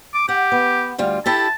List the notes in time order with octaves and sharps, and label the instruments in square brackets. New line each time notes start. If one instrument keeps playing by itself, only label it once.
[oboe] D6
[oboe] G4 [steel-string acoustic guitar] F#5
[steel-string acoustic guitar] B3
D2 G3 F4
[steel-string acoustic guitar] E4 G4 A4 [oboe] A5